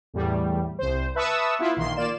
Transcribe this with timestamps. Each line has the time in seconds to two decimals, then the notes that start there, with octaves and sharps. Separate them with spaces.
0.14 E2 A2 G3
0.79 C2 C5
1.15 B4 E5 A5 C#6 D#6 E6
1.59 B3 E4 F4
1.77 A#1 D#3 A#3 C6
1.97 A#3 F4 D5 E7